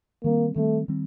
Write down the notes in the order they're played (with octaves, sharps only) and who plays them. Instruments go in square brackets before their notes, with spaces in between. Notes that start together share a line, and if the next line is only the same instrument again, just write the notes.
[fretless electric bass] D#3 G3 C4 [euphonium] A#3
[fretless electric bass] D#3 G3 C4 [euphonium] A3
[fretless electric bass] D#3 G3 C4